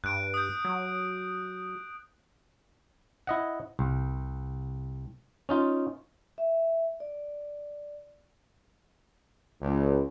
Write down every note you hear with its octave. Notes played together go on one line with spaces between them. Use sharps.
G2 F#6 D7
D#6 G6
F#3
E4 D#5 F#5
C2
C#4 D#4 F4
E5
D5
C#2